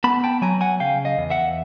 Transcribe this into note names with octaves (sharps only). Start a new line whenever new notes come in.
B3 A5 B5
G5 A5
F#3 G#5 A#5
F#5 G#5
C#3 F5 G5
D#5 F5
E2
E5 F#5